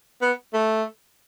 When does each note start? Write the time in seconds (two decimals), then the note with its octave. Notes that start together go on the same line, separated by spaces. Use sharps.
0.21 B3
0.53 A3